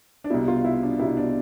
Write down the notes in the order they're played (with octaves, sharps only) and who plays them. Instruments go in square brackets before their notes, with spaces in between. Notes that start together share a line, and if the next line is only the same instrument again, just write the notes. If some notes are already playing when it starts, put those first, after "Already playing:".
[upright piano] D4
C2 B2 E4
F4
E4
D4
C2 B2 E4
D4